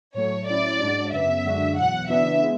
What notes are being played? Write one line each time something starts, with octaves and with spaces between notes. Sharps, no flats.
A2 F#3 A3 C#5
A2 F#3 C#4 E4 D5
G#2 G#3 D4 F#4
F#2 C#3 F#3 B3 E5
F#2 D3 G#3 D4 F#4
E2 B2 F#3 F#5
C#3 E3 B3 D4 F#4 E5
G#3 B3 E4